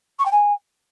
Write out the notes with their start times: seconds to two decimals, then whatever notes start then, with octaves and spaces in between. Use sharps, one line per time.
0.19 C#6
0.25 G5
0.32 G#5